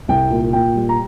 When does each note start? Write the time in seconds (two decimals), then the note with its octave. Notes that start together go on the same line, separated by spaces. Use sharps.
0.08 C2 G5
0.30 A#2
0.53 A#2 G5
0.75 G3
0.89 A#5